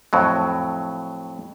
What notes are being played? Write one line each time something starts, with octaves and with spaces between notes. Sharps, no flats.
F2 A2 F#3